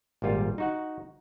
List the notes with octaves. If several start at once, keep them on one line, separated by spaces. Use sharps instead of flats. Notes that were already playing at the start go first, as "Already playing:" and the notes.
G#1 A#2 G3 F4
D#4 F#4 F#5